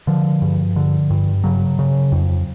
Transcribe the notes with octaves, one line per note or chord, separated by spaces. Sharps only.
D3 F3
G2
D3
G2
C#3 F#3
C#3
F2